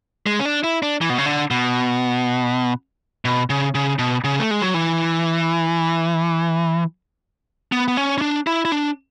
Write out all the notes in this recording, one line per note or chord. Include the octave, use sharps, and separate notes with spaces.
G#3
C#4
D4
E4
D4
E3
B2
C#3
D3
B2
B2
C#3
C#3
B2
C#3
A3
G#3
F#3
E3
B3
B3
C#4
C#4
D4
E4
E4
D4